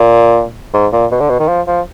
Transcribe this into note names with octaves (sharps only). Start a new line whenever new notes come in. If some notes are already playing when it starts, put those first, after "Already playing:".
Already playing: A#2
G#2
A#2
B2
D3
B2
D#3
F3
F3